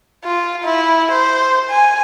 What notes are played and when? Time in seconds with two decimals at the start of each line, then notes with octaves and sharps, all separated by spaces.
0.24 F4
0.64 E4
1.12 C5
1.71 G#5